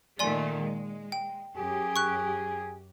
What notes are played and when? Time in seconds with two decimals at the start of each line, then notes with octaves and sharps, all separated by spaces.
0.19 A#2 D#3 A3 D5 G#5 C6
0.60 G#3
1.12 G5
1.55 F#2 G4 G#4
1.96 C#6 F#6